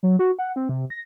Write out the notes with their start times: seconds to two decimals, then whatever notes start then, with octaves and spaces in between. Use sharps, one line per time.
0.03 F#3
0.19 F#4
0.39 F#5
0.56 C4
0.69 C3
0.90 A#6